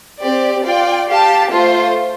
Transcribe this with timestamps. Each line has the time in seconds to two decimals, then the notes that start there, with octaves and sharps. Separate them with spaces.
0.21 C4 G4 D5
0.65 F4 D5 G5
1.08 G4 F5 A5
1.52 A3 F4 C5